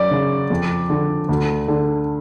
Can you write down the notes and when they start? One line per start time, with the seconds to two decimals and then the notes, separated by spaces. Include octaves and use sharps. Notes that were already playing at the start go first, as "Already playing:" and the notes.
Already playing: F#2 D5
0.11 C#3
0.50 F2
0.90 D3
1.29 D2
1.68 D3